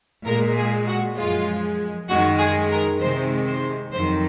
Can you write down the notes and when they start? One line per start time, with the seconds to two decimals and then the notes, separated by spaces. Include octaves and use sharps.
0.24 A#2 G#3 A#4
0.56 G#4
0.86 F#4
1.16 F#2 F3 G#3 F4
2.08 F#2 D#3 G#3 F#4
2.39 G#4
2.70 A#4
3.00 C3 D#3 G#3 C5
3.46 C5
3.91 F2 D#3 F#3 C5